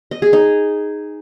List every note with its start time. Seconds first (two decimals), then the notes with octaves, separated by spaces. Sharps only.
0.11 D#5
0.22 G#4
0.33 D#4